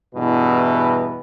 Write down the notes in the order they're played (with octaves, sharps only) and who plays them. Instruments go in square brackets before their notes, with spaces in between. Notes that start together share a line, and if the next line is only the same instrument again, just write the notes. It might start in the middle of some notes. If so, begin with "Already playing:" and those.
[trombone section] E2 G2 B2 E4 B4